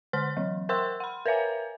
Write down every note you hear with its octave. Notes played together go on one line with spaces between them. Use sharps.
D3 C5 C6 F6
E3 F#3
A#4 C5 G5 C6 E6
F#5 B5
A#4 B4 C#5 E5 G#5